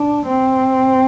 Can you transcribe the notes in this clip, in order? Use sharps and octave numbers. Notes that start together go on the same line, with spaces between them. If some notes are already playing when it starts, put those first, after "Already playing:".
Already playing: D4
C4